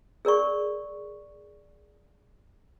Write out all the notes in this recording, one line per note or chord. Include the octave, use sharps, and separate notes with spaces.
G#4 A#4 D5 C#6